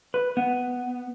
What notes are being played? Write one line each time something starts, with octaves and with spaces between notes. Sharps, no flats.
B4
B3